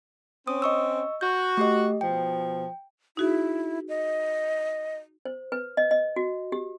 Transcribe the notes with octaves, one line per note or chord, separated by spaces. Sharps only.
C4 C#4 D#6
D#5 C#6 E6
F#4 G6
A3 G4 D#5
B2 F3 G5
D#4 E4 F#4 G#4
D#5
C5
B4
D#5
D#5
F#4
G4